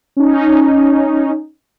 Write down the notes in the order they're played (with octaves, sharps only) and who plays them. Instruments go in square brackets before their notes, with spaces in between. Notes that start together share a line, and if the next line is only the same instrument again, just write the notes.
[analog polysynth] C#4 D#4